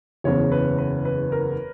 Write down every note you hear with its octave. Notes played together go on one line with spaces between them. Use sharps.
F#1 E2 C#3 C#5
B4
B4
B4
A#4